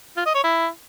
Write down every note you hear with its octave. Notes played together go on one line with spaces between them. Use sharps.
F4
D#5
C#5
E4